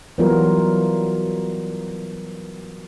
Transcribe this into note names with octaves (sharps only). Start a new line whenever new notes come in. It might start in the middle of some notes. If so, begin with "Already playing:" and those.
E3 F#3 G3 B3 F4 A#4